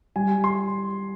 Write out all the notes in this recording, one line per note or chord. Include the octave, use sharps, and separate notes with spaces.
G3 G#5
C6